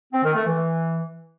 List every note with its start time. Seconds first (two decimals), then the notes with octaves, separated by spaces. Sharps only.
0.13 C4
0.24 D#3
0.35 A3
0.46 E3